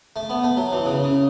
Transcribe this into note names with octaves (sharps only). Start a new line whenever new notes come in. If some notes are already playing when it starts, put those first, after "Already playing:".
A3
B3
A3
F#3
E3
C#3
C#3